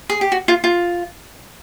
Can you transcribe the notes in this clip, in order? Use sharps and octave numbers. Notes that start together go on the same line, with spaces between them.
G#4
G4
F#4
F4
F4